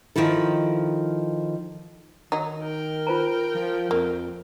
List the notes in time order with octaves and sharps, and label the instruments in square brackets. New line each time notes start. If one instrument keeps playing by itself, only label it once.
[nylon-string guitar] D#3 F3 D#4 E4 A4
[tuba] D#3 [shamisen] F#3 D#4
[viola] A#4 G5
[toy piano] F4 C5 A#5
[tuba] F3
[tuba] F2 [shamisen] A#3